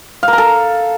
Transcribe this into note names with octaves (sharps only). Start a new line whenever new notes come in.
F5
A#4
A#5
A4